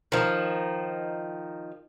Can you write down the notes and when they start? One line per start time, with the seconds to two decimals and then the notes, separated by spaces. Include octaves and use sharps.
0.12 D#3 F3